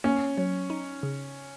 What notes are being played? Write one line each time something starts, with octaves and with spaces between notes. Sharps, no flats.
A#3 C#4
F#3
D#4
C#3